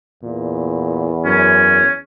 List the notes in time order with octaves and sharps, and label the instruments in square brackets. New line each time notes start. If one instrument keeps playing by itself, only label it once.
[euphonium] E2 [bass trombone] A#2
[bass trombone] F#2 [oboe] C#4